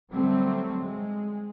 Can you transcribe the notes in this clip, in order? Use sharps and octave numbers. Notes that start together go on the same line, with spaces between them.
D3 F#3 G3 A3 C4
G#3